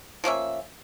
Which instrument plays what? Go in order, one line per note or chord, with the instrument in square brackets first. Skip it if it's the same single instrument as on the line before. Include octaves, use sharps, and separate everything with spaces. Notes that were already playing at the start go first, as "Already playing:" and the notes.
[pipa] F3 A#3 C#4 E5